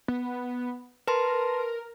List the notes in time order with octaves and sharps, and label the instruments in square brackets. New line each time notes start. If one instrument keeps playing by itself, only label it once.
[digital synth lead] B3
[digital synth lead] A#4 [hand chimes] B4 A5 C6